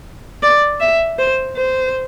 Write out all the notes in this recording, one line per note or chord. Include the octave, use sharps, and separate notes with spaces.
D5
E5
C5
C5